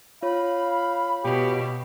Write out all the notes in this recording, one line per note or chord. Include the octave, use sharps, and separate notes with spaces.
F4 C#5 F5 B5
B2 G4